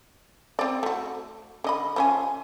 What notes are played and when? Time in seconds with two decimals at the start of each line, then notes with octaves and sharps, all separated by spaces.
0.59 C4 D5
0.83 A3 F#4
1.64 D3 D#5 B5
1.96 F3 C#4 G#5